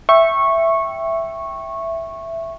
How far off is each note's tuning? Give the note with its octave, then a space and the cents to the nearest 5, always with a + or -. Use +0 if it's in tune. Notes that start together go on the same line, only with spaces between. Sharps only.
E5 +5 G5 -5 C#6 -15